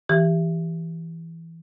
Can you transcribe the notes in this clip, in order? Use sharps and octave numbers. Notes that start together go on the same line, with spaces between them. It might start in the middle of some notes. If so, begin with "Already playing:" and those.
E3 G4